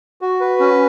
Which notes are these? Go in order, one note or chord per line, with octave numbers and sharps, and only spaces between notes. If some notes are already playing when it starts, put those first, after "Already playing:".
F#4
B4
C#4